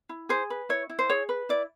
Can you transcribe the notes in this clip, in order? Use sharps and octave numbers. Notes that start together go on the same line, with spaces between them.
E4
G#4 C5
B4
E4 C#5
E4
C5
G#4 C#5
B4
E4 D5